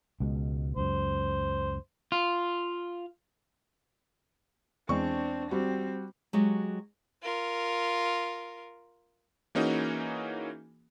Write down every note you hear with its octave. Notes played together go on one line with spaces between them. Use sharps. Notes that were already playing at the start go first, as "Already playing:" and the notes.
C#2 B2 G#3
C#2 F#2 C5
F4
E2 G#3 C4 D4 D5 C#6
G3 C4 F#4
F#3 G#3 F#4 G4
F4 A#4
E3 A#3 C#4 D#4 F#4 G#4